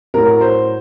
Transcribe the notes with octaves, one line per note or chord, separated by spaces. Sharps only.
A2 F#3 A#4
C5